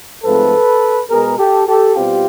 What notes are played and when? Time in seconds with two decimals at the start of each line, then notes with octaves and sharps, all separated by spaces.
0.24 G#2 F3 A3 C4 A4 B4
1.09 B2 G#3 B3 G#4 A#4
1.38 G4 A4
1.67 G4 A4
1.96 B2 G3 C4 F4 G4